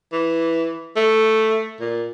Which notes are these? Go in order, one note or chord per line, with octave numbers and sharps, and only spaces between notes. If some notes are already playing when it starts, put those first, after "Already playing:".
E3
A3
A#2